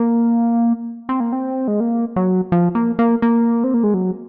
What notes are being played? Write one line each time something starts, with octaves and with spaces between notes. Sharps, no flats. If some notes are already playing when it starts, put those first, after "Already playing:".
Already playing: A#3
C4
A#3
C4
G#3
A#3
F#3
F3
A#3
A#3
A#3
C4
A#3
G#3
F#3